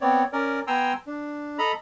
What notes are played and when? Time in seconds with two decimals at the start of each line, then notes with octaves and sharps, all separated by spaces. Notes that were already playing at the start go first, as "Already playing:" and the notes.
0.01 B3 C4 C#5 D5
0.33 C#4 A#4 D5
0.67 B3 G5 G#5 A#5 C6 E6
1.07 D4
1.58 A4 D#5 A#5 B5